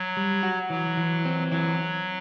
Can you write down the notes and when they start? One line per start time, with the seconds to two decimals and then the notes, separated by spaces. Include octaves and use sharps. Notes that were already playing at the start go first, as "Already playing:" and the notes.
Already playing: F#3
0.17 G3
0.43 F#4
0.70 E3 F#3
0.97 E3
1.25 C4
1.51 E3 F#3